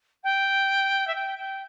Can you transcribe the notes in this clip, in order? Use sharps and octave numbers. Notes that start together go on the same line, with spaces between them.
G5
E5
G5
G5